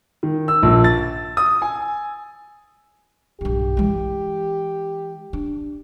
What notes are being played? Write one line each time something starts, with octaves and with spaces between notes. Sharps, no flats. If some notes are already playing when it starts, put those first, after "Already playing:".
D#3
E6
A#1
A6
D#6
G#5
B1 G2 G4
E3 G#3
D4